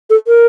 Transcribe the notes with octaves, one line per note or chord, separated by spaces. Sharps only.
A4
A#4